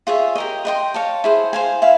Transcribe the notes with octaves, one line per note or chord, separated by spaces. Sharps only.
F4 G#4 C#5 E5
G4 A#4 D#5
B4 D#5 G5 C6
C#5 F5 A5
E4 G#4 C5
C5 F5 G#5
E4 F5